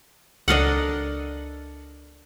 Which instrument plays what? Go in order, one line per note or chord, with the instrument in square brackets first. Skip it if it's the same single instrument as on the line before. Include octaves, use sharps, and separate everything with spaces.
[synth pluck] C#2 [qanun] D4 A4 A#4 [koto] D#5 F5 F#5